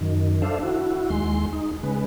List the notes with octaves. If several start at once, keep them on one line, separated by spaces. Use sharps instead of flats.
F#2 D#3
D4 A4 C5 E5 F5
E4 F#4
D#2 G#3 C6
D#4
C#3 G#3 B4